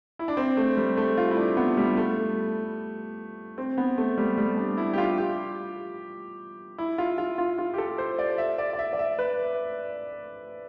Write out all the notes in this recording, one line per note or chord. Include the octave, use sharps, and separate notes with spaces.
E4
D4
C4
A3
G3
A3
F4
E4
D4
B3
G3
A3
C4
B3
A3
G3
G3
D4
E4
G4
F4
G4
E4
F4
F4
F4
F4
G4
A4
C5
D5
E5
D5
D5
E5
D5
E5
B4